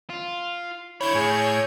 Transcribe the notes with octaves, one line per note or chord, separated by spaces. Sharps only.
F4
D3 E4 C#5 B5 G6 G#6
A2 G#4